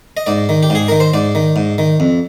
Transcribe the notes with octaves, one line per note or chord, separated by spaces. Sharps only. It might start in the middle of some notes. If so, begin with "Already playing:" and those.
D#5
G#2 D5
D#3
G4
G#2 G#4
D#3 A#4
C5
G#2 D5
D#3
G#2
D#3
F2